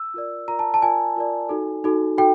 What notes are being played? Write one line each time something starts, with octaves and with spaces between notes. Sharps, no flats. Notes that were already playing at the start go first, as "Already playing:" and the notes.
Already playing: E6
F4 A#4 D5
F4 A#4 D5 A#5
A5
A5
F4 A#4 D5 G#5
F4 A#4 D5
D#4 F#4 A4
D#4 F#4 A4
D#4 F#4 A4 G5